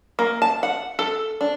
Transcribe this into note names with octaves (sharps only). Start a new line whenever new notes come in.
A#3
A5
F#5
A4
D4